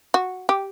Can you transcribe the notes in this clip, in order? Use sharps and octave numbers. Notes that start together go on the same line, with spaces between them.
F#4
G4